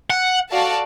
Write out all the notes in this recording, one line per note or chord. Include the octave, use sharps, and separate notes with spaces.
F#5
F#4 A4 D5 F5 A5